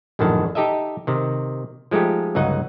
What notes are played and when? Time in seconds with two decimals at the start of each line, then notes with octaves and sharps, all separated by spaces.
0.19 A#1 F#2 A2 D3 D#3 A5
0.55 D#4 G4 A4 D#5 E5
1.07 C3 D#3
1.91 F3 G#3 A3 D#4 G4
2.35 G1 C#2 F#3 D#4 D#5 F#5